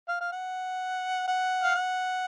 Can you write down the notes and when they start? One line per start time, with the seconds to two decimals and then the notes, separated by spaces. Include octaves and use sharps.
0.09 F5
0.21 F5
0.32 F#5
1.28 F#5
1.63 F5
1.75 F#5